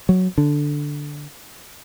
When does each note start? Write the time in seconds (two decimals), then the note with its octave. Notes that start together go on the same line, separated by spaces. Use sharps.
0.09 F#3
0.38 D3